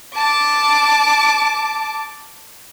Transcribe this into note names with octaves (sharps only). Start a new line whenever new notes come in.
A5 D6